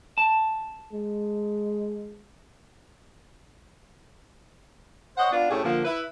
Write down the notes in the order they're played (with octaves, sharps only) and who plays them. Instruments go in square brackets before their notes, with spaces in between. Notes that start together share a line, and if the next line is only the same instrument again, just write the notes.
[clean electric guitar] A5
[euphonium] G#3
[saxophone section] C5 C#5 D#5 F#5
B3 D4 F4
A2 C3 A3 C#4 G4 G#4
D3 F3 A#3
E4 B4